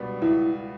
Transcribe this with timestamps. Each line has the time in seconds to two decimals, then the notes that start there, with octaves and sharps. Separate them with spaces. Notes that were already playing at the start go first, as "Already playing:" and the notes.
Already playing: C#2 B2 G3 B3 D4
0.22 C#2 E4